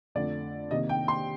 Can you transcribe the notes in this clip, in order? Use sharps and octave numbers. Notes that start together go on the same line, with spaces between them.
F2 D3 A3 D4 D5
C3 D#3 A#3 D#5
G5
C6